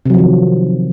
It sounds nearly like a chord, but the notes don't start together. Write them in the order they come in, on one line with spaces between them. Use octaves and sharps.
C3 F#3 F3 D#3